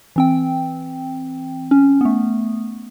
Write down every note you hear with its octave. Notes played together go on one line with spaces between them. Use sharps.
E3 C4 G5
C#4
A3 B3